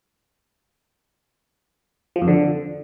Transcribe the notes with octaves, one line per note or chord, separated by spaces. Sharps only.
F3
F2
D3